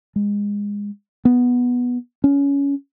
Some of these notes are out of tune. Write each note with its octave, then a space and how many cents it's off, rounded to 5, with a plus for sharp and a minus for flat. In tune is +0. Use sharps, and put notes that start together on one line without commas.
G#3 -25
B3 -5
C#4 +20